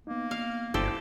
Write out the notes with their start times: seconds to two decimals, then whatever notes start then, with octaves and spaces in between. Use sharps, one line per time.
0.07 A#3 B3 D#4
0.31 F5
0.74 G1 E4 G4 A4 C5